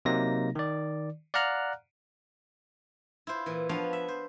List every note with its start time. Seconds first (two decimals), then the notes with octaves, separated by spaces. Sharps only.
0.05 C3 F#3 A#3 D#4 A#6
0.55 D#3 D5
1.34 D5 F5 F#5 A#5 F6 F#6
3.27 E4 F4 C5
3.46 A#2 E3
3.69 F3 B3 D4 C#5 F5
3.93 E5
4.08 C5